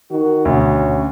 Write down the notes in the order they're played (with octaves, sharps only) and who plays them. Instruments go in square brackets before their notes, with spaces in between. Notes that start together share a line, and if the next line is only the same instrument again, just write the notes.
[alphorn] D#3 [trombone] F#4
[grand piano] D2 [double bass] B2 [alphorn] C#4